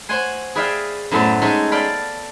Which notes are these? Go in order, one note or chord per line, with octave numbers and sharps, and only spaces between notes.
C5 C#5 F#5 G#5 C6
G#4 B4 D5 E5 F5 G5
F#2 A2 B3 A4 C5 D5
G#3 C#4 D#4 A4 D#5 E5
A4 D5 F5 G5 B5